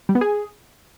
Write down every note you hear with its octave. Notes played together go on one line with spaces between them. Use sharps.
G3
B3
G#4